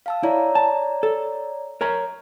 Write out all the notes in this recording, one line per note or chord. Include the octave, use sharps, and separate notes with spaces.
F5 A5 E6
E4 C#5 D5 A#5
A5
A4
A#4 C#5 A#5